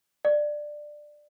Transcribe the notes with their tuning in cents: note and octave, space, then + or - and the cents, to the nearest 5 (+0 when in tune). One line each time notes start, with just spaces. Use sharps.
D5 +15